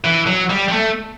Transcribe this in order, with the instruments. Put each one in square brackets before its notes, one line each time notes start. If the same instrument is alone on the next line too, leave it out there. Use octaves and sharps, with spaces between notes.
[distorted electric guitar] E3
F#3
G3
G3
A3